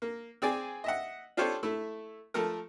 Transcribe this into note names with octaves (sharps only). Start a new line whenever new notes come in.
A#3
C4 G#4 D5 G#5
D#5 E5 F#5
D4 F4 G4 A4 C5 C#5
A3 E4
F3 A3 A4 A#4